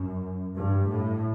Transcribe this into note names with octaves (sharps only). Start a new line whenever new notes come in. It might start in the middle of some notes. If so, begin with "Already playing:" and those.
Already playing: F#2
G2
A2